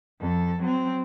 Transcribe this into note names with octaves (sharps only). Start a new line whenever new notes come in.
F2 A4
F#3 C4